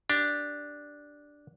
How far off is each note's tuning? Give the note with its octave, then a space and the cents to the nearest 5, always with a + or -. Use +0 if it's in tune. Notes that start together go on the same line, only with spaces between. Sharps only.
D4 +0 G4 +0